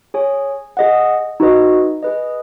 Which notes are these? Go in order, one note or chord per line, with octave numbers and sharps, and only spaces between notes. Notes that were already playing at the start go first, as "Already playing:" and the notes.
G#4 C#5 G#5
G#4 D#5 F#5
D#4 F#4 B4 D#5
G#4 B4 D#5